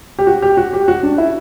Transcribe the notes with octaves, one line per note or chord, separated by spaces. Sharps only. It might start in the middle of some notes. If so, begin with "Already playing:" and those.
G4
F#4
G4
F#4
G4
F#4
D4
E4